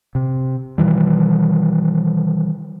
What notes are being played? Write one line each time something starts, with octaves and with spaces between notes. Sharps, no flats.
C3
B2 D#3 E3 G3